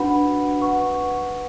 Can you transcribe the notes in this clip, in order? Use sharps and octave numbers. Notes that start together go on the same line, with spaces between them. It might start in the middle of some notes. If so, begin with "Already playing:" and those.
Already playing: D4 F#4 B4 F#5 B5
B4 F#5 C#6